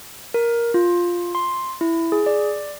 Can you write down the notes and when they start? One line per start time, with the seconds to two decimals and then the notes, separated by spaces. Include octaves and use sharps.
0.34 A#4
0.74 F4
1.35 C6
1.81 E4
2.12 G#4
2.26 D5